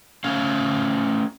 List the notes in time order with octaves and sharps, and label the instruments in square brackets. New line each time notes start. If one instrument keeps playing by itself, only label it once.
[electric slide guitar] A3 C#4 F5